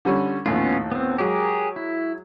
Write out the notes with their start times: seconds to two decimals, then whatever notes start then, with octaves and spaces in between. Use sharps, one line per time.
0.05 D3 G3 C#4
0.46 A#1 D#2 A2 B3 C#4 F4
0.92 B3 C4
1.18 F#3 G#3 G4 G#4 A#4
1.76 E4